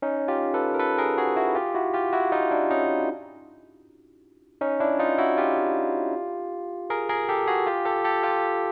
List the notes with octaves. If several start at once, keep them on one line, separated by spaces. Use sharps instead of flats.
C#4 D#4
F4 G4
A4 B4
A#4
A4 B4
G#4 A#4
F#4 G#4
E4 F#4
F4 G4
E4 F#4
F4 G4
E4 F#4
D#4 F4
D4 E4
C#4 D#4
C#4 D#4
D4 E4
D#4 F4
E4 F#4
F4 G4
G#4 A#4
G#4 A#4
G4 A4
F#4 G#4
F4 G4
G4 A4
G4 A4
F4 G4